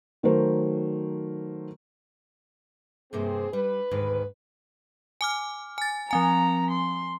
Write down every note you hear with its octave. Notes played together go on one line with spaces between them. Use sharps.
D#3 F#3 A3 A#4 C5
G2 C3 A#3 C4 G#4
G3 B4
D2 G#2 D#3
G#5 D6 F6
G#5 A6
F3 C4 G#5 A#5
C6